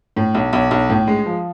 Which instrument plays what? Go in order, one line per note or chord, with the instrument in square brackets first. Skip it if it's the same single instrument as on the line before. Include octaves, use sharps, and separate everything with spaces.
[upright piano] A2
B1
B1
B1
A2
G#3
F3